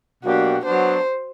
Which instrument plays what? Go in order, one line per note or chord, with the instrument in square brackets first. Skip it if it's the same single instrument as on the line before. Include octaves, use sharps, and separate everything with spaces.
[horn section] B2 F#3 A#3 D4 G4 [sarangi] F#4
[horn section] F#3 B3 D4 [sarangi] C5